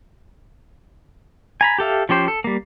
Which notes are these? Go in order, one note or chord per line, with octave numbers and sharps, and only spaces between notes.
G#5 A#5 B5
G4 A4 E5 F5
F3 C#4 G4 C5
A4
G3 A#3